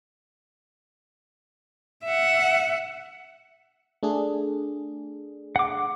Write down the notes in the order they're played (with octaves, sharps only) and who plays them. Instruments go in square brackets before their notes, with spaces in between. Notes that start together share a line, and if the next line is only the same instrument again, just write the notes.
[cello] E5 F#5
[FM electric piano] A3 D4 G#4
[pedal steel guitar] F#5 D6